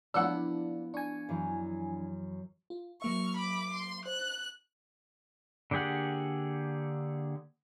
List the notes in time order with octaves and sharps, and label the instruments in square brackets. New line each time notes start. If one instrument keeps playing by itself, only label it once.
[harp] F3 B3 E4 [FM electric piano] D4 [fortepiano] F#5 E6
[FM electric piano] D4 G#5 [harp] C#6
[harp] F#2 E3
[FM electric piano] F4
[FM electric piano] F#3 A#3 E5 [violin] C#6 F6
[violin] B5 D6
C6
[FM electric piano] C5 [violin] F#6
[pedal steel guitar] D3 A#3 G4 G#4 F#5